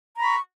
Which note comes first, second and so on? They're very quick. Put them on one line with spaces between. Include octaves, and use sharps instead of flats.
A#5 B5 C#6